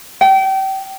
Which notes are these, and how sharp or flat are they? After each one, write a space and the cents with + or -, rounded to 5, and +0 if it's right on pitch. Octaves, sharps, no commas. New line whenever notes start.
G5 -30